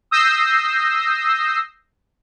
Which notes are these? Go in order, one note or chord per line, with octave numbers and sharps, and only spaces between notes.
D#6 E6 G6 A#6 C7